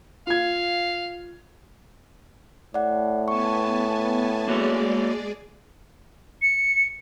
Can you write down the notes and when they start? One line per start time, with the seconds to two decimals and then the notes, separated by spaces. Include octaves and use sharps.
0.27 F4 F5 G#6
2.74 A2 D5 F#5
3.28 B3 G#5 A5 C#6
4.48 G#3 A#3 F#4 G#4 C#5 D5
6.42 C#7